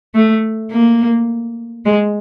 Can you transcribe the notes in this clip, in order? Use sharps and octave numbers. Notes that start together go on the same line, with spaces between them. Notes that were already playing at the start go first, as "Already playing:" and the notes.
A3
A#3
G#3